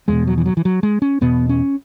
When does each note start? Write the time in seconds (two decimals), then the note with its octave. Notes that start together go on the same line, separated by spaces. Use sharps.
0.08 E2 B2 G#3
0.27 F#3
0.38 E3
0.46 F#3
0.57 E3
0.65 F#3
0.83 G#3
1.02 C#4
1.21 E2 B2 B3
1.49 C#4